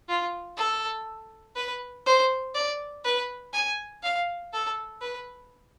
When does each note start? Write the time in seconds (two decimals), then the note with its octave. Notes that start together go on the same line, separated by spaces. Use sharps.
0.09 F4
0.57 A4
1.56 B4
2.06 C5
2.55 D5
3.04 B4
3.53 G#5
4.03 F5
4.53 A4
5.01 B4